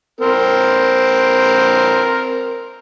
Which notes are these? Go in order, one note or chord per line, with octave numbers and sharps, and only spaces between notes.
C4 A#4